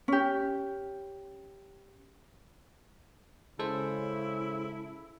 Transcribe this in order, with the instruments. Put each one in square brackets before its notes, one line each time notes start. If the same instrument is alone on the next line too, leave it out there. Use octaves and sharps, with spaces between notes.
[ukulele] C#4 G4
[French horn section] C#3 [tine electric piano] G#3 A4 C5 [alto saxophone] E4